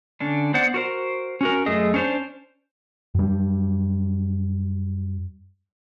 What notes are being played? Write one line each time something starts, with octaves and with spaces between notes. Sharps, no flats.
D3 C#4 D4
B3 C5 D5 F#5
F#4 A#4 C5
C#4 F#4 A#4
F#2 A3 G#4 D#5
C#4 D4 C5 C#5
F#2 G3